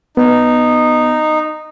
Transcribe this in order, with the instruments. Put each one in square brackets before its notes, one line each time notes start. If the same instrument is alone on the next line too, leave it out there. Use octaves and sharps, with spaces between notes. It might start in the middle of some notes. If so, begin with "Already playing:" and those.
[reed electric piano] B3 [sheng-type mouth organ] D#4